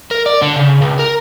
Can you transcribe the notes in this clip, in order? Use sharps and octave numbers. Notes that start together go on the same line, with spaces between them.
A#4
D5
D3
C#3
C#2
A#4